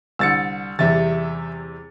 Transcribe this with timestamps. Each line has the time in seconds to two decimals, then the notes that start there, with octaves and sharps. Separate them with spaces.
0.19 C2 D3 E6 A6 C#7
0.79 E2 C3 G3 E5 A6